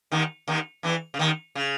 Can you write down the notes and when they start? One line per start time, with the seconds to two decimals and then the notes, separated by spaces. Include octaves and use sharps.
0.12 D#2 D#3
0.48 D#2 D#3
0.83 E2 E3
1.14 C#3
1.19 D#2 D#3
1.55 C#3